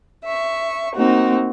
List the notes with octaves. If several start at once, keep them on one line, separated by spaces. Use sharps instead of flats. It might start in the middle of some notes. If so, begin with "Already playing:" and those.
E5 C#6
A#3 C4 D#4 F#4